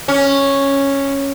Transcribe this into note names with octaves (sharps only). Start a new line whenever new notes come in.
C#4